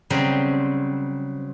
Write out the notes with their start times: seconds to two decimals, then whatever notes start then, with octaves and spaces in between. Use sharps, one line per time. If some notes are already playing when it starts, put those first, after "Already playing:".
0.10 C#3 F#3 G3 C4